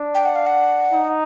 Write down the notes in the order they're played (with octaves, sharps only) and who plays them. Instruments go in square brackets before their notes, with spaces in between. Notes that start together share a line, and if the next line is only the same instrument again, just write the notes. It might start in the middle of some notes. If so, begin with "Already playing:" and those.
Already playing: [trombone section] D4
[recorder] G5
F#5
F5
F#5
[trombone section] D#4